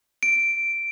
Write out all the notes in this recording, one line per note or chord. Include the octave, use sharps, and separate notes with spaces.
D7